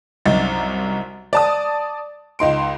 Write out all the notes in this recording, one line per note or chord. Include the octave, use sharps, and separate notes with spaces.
C2 F#2 D#4 A6
D5 A5 D#6
C#2 D#4 C6 D7